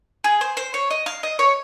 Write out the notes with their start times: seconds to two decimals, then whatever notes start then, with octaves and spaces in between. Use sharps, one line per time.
0.24 G#4
0.41 C5
0.57 C5
0.74 C#5
0.90 D#5
1.06 F5
1.23 D#5
1.39 C#5